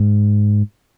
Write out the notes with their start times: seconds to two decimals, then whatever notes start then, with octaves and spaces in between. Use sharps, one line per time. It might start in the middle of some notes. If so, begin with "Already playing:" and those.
Already playing: G#2